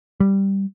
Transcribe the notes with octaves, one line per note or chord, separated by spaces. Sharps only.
G3